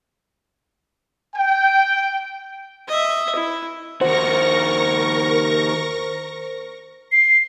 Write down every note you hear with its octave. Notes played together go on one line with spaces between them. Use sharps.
G5
D#5 E5
E4
D#2 F#4 A#4 C5 C#6 A#6
C7